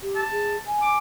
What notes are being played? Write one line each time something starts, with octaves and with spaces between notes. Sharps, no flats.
G4
A5
G#4
G#5
D6